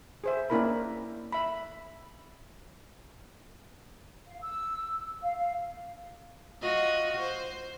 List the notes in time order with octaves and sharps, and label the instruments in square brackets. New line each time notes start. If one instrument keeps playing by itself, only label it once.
[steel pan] G#4 C5 E5
A#3 C#4 D4 E4 A#4 B5
E5 B5
[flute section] F5
E6
F5
F5
[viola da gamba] F4 F#4 D#5
C5